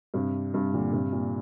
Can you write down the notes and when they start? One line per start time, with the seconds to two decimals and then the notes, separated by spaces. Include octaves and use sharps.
0.14 G2 C3
0.54 G2 C3
0.73 A#2 D3
0.93 G2 C3
1.12 A#2